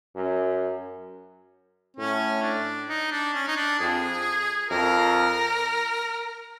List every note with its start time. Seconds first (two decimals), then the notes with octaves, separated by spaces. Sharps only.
0.15 F#2
1.97 A2 C#4
2.42 D4
2.89 D#4
3.11 D4
3.34 C#4
3.48 D#4
3.56 D4
3.80 F2 G#4
4.70 F2 A#4